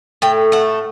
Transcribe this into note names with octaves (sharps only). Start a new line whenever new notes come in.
A2 G5
A3 F#5